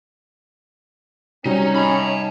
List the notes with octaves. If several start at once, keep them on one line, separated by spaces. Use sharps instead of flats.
C3 F#3 G3 C#4 D#4
D#4 A5 B5